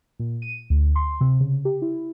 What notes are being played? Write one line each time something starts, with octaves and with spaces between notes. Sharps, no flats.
A#2
D#7
D2
C6
C3
C#3
G4
E4